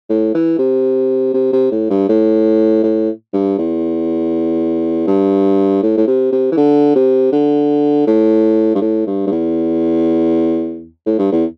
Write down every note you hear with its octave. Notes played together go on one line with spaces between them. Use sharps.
A2
E3
C3
C3
C3
A2
G2
A2
A2
G2
E2
G2
A2
A2
C3
C3
E3
D3
C3
D3
A2
G2
A2
G2
G2
E2
A2
G2
E2